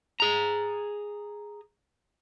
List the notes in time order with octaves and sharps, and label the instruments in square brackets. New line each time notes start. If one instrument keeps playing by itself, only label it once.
[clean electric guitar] G#4 A#5